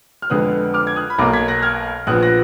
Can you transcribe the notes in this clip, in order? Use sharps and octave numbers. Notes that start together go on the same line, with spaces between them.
F6
F2 D3 G#3 B3 D#6 F#6
D6 F6
G#6
D#6 F#6
B5
B1 B2 A#3 A#5 D6
G#6 B6
F#6 A#6
F6 G#6
A#1 A#2 F3 B3 D#6 F#6
F#6 A#6